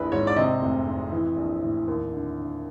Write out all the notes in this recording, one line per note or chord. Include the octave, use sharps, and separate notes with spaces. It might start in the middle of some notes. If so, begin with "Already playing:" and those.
Already playing: A#1 F2 E3 B4
G#2 C#5
D5
C3 D#5
F1
F2
E3
A#1
A2
D#2
D3
D3